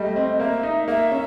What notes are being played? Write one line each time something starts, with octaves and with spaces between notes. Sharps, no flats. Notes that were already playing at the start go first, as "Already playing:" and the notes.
Already playing: G3 A3 D#5
C4
A#3 E5
D#4
A#3 E5
C#4